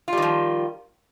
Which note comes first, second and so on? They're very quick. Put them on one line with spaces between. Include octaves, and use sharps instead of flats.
F4 G3 D#3 F3